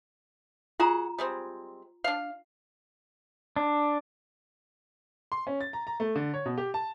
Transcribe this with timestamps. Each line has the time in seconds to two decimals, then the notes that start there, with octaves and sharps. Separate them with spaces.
0.80 F4 F#4 G#4 F#5 A#5
1.19 G3 G#3 C4
2.04 D4 F5
3.56 D4
5.32 C6
5.47 C#4
5.61 A6
5.73 A#5
5.87 A#5
6.00 A3
6.15 D3
6.34 C#5
6.46 B2
6.58 G4
6.74 A5